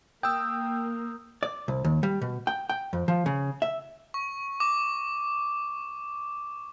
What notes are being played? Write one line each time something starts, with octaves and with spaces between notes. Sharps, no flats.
A#3 G5 D#6 E6 G6
D5
C2
D#2
G3
B2
G5
G5
F2
F3
C#3
E5
C#6
D6